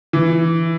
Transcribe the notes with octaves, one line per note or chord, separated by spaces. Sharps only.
E3